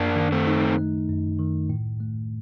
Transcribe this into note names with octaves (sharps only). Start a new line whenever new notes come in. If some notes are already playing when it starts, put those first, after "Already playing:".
Already playing: F#2 A#3 D4
D#3
A3 C4
D#4
A3
F#2
D#3
A2
A3